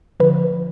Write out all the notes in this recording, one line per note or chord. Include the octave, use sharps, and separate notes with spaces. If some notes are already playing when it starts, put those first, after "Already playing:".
D3 F3 B4